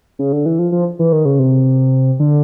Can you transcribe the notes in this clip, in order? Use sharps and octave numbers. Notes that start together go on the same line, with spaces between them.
C#3
D3
E3
F3
F3
E3
D#3
C#3
C3
D3